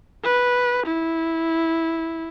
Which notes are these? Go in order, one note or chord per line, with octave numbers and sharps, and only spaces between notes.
B4
E4